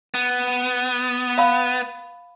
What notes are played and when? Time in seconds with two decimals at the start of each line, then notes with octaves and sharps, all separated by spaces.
0.14 B3
1.38 F5 B5